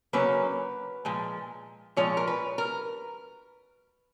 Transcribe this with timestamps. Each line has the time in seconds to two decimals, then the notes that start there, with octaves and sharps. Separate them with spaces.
0.13 C#3 F#3 A#3 C#4 B4
1.05 A#2 F3 G#3
1.96 A#2 F3 G#3 C#5
2.17 A#4
2.27 B4
2.58 A#4